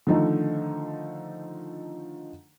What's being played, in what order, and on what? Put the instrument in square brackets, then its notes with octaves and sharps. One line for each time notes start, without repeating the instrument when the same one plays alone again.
[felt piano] D3 D#3 F3 A3 D#4